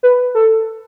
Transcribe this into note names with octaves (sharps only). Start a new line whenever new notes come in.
B4
A4